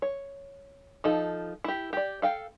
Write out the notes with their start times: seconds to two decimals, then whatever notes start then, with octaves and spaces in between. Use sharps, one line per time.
0.02 C#5
1.04 F3 D#4 A4
1.64 E4 G4
1.93 G4 D5
2.22 A4 F5 G5